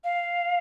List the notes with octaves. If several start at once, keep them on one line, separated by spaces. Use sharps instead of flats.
F5